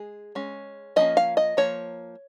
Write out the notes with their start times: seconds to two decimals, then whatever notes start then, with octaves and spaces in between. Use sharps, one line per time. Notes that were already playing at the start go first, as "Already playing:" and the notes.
Already playing: G#3 G#4
0.35 G#3 C#4
0.96 F3 A#3 C#4 D#5
1.17 F5
1.37 D#5
1.57 F3 A#3 C#5